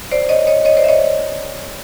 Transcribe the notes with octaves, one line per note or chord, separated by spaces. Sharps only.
C5 D5
C#5 D#5
C#5 D#5
C#5 D#5
C5 D5
E5
C#5 D#5